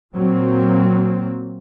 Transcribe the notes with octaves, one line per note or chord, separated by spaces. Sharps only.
A#2 F#3 A#3 C4